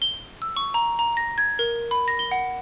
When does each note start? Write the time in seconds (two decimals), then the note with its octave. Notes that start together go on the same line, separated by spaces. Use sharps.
0.02 G7
0.42 E6
0.57 C#6
0.74 A#5
0.99 A#5
1.17 A#6
1.38 G#6
1.59 A#4
1.91 B5
2.08 A#6
2.19 G7
2.32 F#5